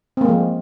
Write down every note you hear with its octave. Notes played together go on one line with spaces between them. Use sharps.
F3 G#3 A#3 C4